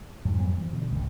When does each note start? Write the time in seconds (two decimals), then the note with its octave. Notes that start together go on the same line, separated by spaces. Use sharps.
0.25 F2 G#2 F#3
0.38 F2 F#3 G3 B3
0.58 E3 F3
0.73 B2 D3
0.91 G#1 C#2